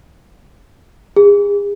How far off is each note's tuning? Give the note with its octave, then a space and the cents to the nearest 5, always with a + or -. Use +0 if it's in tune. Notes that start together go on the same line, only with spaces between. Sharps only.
G#4 -35